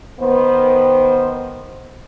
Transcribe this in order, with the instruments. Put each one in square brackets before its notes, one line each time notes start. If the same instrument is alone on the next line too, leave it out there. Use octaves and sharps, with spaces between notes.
[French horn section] D#3 B3 C5